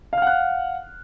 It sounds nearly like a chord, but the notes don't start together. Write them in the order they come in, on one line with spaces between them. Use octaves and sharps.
F5 F6 F#5 F#6